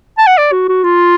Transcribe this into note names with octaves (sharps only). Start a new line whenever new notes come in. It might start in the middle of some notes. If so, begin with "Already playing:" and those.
A5
F#5
D5
F#4
F#4
F4